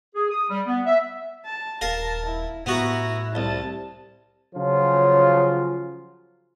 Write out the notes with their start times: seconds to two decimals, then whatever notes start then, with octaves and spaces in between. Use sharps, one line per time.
0.15 G#4
0.31 D#6
0.50 G3
0.66 B3
0.86 E5
1.46 A5
1.81 D#1 A#4 F5 A5
2.27 E4
2.66 A2 B3 E4 F#4 A#5
3.35 C2 A5
4.55 C#3 F3 F#3 F4